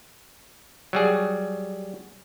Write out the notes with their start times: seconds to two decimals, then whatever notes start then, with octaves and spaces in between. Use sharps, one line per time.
0.93 F#3 G3 G#4